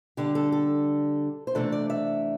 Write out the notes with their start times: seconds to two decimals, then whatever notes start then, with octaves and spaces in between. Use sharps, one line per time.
0.17 D3 G3 D4 G4
0.35 A4
0.52 A4
1.47 C5
1.55 C3 E3 A3 D4 A4
1.72 D5
1.90 E5